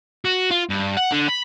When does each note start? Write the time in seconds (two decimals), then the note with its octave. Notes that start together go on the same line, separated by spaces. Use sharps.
0.25 F#4
0.51 F4
0.69 G2
0.97 F#5
1.12 D3
1.28 B5